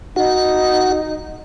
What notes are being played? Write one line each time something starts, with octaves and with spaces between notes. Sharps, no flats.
D#4 F#4 F#5